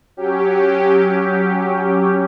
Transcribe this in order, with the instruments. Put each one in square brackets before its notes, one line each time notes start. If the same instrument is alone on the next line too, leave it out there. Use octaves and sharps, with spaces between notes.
[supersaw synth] F#3 C#4 G4